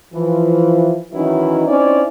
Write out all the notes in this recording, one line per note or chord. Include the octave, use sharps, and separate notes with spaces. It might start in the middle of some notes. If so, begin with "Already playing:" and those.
E3 F3
D#3 E3 F#3 C#4 D#4 E4
C4 C#4 D#4 E4 C#5 D5